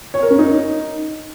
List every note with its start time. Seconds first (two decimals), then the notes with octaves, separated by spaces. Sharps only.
0.14 C#5
0.22 A#4
0.31 C#4
0.39 D#4